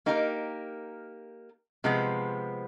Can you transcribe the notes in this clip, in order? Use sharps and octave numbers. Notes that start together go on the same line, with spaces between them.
A#3 D#4 G4 A#4
C3 F3 G#3 B3